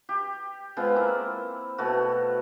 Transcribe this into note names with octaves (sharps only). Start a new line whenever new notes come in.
G4
G#3 B3 C4 F4
A#3 E4
B2 A3 F#4